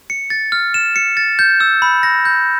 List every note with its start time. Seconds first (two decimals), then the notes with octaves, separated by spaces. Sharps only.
0.10 C#7
0.30 A6
0.52 F6
0.74 E7
0.96 C#7
1.17 A6
1.39 G6
1.60 E6
1.82 B5
2.03 A#6
2.25 G6